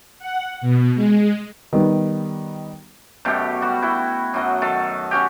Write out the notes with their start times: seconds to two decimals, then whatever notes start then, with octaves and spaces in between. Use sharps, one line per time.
0.19 F#5
0.61 B2
0.95 G#3
1.73 D#3 G3 B3
3.25 F#2 B2 A3 G4
3.62 G3 F#4
3.82 E4 F#4 G5
4.34 F#2 F#3 D#5
4.62 D#3 A4
5.11 C#4 F#4 G4